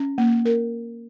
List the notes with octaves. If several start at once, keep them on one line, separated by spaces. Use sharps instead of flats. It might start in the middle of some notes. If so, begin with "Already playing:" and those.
Already playing: C#4
A#3
A#4